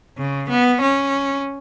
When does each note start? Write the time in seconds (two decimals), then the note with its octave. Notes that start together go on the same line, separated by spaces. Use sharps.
0.18 C#3
0.49 B3
0.82 C#4